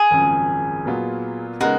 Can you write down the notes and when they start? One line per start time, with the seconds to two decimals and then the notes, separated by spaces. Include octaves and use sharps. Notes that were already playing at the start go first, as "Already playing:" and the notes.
Already playing: G#4
0.11 G#1 F#2 C#3 F3
0.85 A#2 F#3 B3 F4
1.60 C#3 G#3 B3 D#4 F#4 A#4